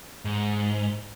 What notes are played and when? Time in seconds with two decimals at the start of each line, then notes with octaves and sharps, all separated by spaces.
0.25 G#2